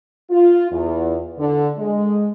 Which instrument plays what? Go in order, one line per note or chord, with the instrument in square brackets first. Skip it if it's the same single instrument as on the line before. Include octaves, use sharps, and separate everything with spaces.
[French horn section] F4
E2
D3
G#3